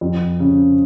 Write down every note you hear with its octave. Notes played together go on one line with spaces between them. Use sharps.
F2
C#3